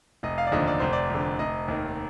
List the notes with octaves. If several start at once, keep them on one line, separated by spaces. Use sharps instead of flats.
F1 D#5
F5
D5
D#2 D3 F3 D#5
D5
F1 C5
D5
F2 D3
F1 D#5
D#2 D#3